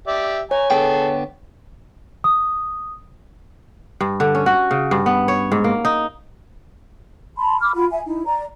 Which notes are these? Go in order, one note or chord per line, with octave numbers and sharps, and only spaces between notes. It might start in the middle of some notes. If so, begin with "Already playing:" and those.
G4 D5 E5
C#5 G#5 A#5
D3 B3 G#4 A4 G5
D#6
G2
D3
C#4
F#4
C#3
G2
B3
C#5
G#2
A#3
D#4
A5 B5 C6
B5 D6 F6
F4 F#4 B5
E5 G#5
D#4 E4
D5 A#5